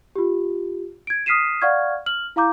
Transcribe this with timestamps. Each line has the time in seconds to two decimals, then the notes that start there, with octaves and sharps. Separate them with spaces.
0.16 F4 G4
1.07 G#6 D7
1.26 D#6 F6 B6 C7 D#7 E7
1.62 D5 F5 F#5 C#6 F6 G#6
2.06 F6 F#7
2.36 E4 F5 A#5 D6 G6